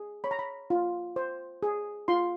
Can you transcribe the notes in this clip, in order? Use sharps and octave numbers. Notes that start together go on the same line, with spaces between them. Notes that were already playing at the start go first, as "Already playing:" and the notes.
Already playing: G#4
C#5 B5
A#5
B5
F4
C5
G#4
F4 C6